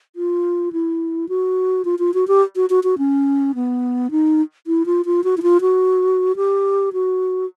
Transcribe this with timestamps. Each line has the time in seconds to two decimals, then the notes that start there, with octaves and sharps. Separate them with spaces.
0.16 F4
0.73 E4
1.29 F#4
1.85 F4
1.99 F4
2.14 F#4
2.28 G4
2.56 F#4
2.70 F#4
2.84 F#4
2.98 C#4
3.55 B3
4.11 D#4
4.67 E4
4.86 F4
5.06 F4
5.24 F#4
5.37 E4
5.43 F4
5.61 F#4
6.36 G4
6.93 F#4